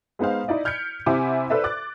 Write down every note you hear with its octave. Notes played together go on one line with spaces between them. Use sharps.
G#3 B3 D#4 C5 F5
D#4 E4 D5 D#5
F6 G6 G#6 B6 C#7 D7
C3 E4 C5 F#5 G#5 D6
A4 B4 C5 D5 E5
D6 F#6 A6